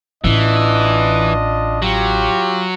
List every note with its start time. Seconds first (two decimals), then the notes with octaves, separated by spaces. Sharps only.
0.24 A1 E3 D4 F4 D#5
1.82 F#3 F4 G4